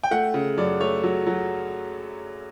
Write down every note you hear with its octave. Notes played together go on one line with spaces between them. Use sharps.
G5
A3 F#5
C#3
F#2 D5
A3 C#5
F#3
F#3